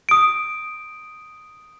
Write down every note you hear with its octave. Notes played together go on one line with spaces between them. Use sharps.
D#6 D7